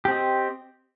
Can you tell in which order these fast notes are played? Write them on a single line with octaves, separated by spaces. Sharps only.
G4 C4 D#5